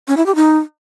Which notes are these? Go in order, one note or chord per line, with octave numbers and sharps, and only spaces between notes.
C#4
E4
G4
D#4